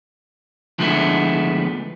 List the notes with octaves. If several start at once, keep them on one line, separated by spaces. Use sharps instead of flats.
D3 F3 G#3 A3 B3 E4